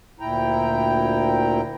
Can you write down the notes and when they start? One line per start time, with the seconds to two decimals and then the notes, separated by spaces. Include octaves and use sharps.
0.20 D2 A#2 E4 G5 A#5